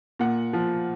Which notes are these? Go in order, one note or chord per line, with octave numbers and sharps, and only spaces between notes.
A#2 F#5
F3